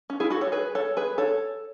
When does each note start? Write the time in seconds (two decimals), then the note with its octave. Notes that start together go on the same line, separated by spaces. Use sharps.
0.10 C#4
0.20 E4 G#4
0.30 F#4 A4
0.41 A4 C#5
0.52 G#4 B4
0.75 A4 C#5
0.97 G#4 B4
1.18 A4 C#5